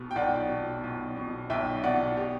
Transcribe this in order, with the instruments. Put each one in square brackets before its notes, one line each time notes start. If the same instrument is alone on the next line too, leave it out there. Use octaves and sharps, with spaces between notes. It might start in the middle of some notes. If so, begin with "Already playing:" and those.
Already playing: [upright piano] B1 B2
G5
B1 D5 F#5
B2
B1
B2
B1 E5 G5
B2 D5 F#5
G4